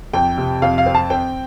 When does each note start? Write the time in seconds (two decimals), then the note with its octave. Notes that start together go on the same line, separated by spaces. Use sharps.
0.13 F2 G5
0.38 C3
0.62 F2 F5
0.78 F5
0.86 C4
0.95 A5
1.10 C4 G5